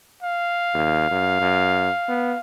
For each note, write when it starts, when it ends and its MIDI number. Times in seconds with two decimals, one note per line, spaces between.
0.23 2.41 77
0.74 1.10 39
1.11 1.36 42
1.41 1.89 42
2.09 2.35 59